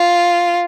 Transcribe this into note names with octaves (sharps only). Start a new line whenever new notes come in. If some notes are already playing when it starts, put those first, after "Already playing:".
Already playing: F4